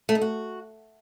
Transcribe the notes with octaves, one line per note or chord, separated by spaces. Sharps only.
A3
D#4
F#4